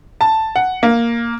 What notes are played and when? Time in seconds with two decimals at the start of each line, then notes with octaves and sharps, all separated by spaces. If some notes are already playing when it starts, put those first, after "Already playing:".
0.21 A5
0.56 F#5
0.83 A#3